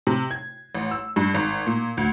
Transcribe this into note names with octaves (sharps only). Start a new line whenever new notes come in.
C3
G#6
A1
E6
G2
G#1
A#2
D2